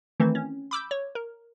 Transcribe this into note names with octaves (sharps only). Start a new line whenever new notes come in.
D#3 E3 A3 C4
C#4
B5 D6 E6 G6
C#5
A#4